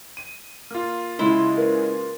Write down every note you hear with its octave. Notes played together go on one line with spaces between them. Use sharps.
D#7
A#3 F4 F6
C#3 G#3 E4 B5 C6 G7
A#4 B4